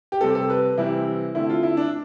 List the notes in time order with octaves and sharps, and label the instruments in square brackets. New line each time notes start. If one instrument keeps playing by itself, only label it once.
[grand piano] G4
C3 G3 C4 A4
A4
B4
C3 E3 G3 C4 E4
D3 A3 C4 E4
F4
E4
D4